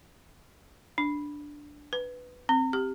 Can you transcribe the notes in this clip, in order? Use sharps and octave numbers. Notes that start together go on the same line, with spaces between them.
D4
B4
C4
G4